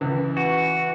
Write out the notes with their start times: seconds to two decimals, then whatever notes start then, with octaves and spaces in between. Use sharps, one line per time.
0.01 C#2 E3
0.37 F#4